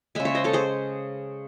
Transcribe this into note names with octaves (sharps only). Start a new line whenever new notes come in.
C#3 G#3 E5 G#5
C#5 E5
C5 D#5
A4 C#5
G#4 C5